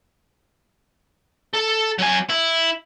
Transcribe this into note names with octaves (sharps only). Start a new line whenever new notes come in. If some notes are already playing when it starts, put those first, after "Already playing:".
A4
F#3 G#5
E4